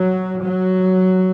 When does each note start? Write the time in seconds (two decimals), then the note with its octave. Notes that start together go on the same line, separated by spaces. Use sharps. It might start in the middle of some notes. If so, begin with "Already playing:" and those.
Already playing: F#3
0.41 F#3